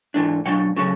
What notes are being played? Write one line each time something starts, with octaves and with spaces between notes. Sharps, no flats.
G#2 E3 A3 D4
B2 F#3 A3 D4 F#5
C#3 F#3 A3 C#4